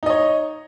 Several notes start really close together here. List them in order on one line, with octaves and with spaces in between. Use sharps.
D#4 D#5 C#5